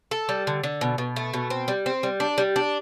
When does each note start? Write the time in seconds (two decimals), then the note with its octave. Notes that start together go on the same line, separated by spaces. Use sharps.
0.11 A4
0.29 G3
0.47 D3
0.63 D3
0.81 B2
0.98 B2
1.16 A3
1.34 B2
1.50 C4
1.68 G3
1.86 C4
2.03 G3
2.20 D4
2.38 G3
2.56 D4